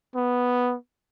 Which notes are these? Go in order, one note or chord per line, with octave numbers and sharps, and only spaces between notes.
B3